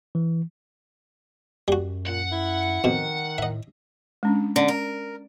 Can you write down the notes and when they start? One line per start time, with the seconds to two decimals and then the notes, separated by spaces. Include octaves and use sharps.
0.15 E3
1.68 F#2 G3 F#4
2.07 A#2 F#5
2.32 E4
2.84 F2 B2 D#3
3.38 A2 D#5 E5
4.23 G#3 C#4 D4
4.56 D3 C#4
4.68 A#4